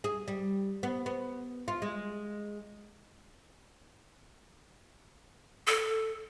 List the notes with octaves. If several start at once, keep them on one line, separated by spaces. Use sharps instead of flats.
G#4
G3
B3
B3
F4
G#3
A4